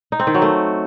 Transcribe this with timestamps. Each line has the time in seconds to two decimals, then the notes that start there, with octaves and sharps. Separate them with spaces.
0.12 D#4
0.20 C4
0.27 D#3
0.34 F#3
0.42 A3